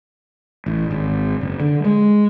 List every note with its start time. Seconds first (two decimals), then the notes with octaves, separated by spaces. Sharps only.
0.66 A1
0.91 G#1
1.41 F#1
1.60 D3
1.85 G#3